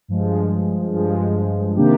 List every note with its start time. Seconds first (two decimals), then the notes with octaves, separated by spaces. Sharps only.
0.08 G2 F3 G#3
0.93 G2 F3 G#3
1.76 C3 D#3 A#3 D4 G4